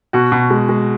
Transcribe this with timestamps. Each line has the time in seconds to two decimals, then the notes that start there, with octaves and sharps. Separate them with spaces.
0.13 B2 F#4
0.32 B2
0.51 G#3
0.69 G#3